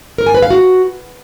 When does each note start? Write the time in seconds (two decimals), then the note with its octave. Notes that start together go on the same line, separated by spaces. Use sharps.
0.18 A#4
0.26 G#5
0.34 B4
0.42 F5
0.50 F#4